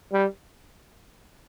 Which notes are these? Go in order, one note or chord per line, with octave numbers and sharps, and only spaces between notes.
G3